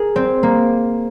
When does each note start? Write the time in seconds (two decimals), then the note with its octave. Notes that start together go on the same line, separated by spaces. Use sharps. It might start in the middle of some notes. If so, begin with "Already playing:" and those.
Already playing: G#4 A#4
0.16 C4
0.43 A#3